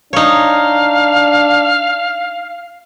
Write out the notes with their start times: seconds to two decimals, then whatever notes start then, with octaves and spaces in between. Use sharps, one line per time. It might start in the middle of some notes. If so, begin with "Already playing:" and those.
0.13 D4 D#4 C#5 F5